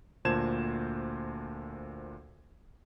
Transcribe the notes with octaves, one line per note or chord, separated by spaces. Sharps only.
D2 A#2 C5 A5 G#6 E7